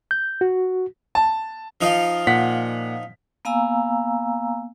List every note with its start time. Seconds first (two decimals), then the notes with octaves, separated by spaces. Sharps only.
0.11 G6
0.41 F#4
1.15 A5
1.81 F3 D#4 F4
2.27 A#2 F#5 B6
3.45 A#3 B3 F5 G#5 A#5 E6